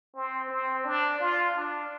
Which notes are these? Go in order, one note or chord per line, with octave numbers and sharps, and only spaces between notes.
C4
C4
D4
F4
D4